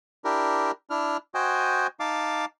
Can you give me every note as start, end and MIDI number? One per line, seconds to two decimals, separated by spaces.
0.25 0.71 62
0.25 0.71 64
0.25 0.71 67
0.25 0.71 70
0.90 1.17 62
0.90 1.17 64
0.90 1.17 89
1.35 1.87 66
1.35 1.87 72
1.35 1.87 75
1.35 1.87 79
1.35 1.87 80
2.00 2.45 63
2.00 2.45 77
2.00 2.45 81
2.00 2.45 86